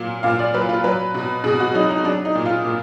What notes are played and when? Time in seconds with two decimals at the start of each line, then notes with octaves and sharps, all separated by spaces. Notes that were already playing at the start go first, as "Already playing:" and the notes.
Already playing: A#2 F#3 F5
0.23 A#2 F5
0.39 D5
0.54 F#3 B4
0.69 F4
0.84 F#3 B4
1.14 B2
1.44 B2 G#4
1.60 F#4
1.74 F#3 D#4
1.90 D#4
2.05 F#3 D4
2.25 D#4
2.35 A#2
2.45 F4
2.65 A#2